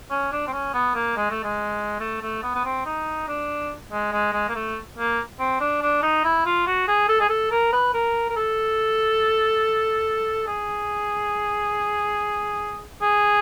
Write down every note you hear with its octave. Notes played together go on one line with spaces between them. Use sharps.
C#4
D4
C4
C#4
B3
A#3
G#3
A3
G#3
A3
A3
B3
B3
C4
D#4
D4
G#3
G#3
G#3
A#3
A3
A#3
C4
D4
D4
D#4
E4
F4
F#4
G#4
A4
G#4
A4
A#4
B4
A#4
A#4
A4
G#4
G#4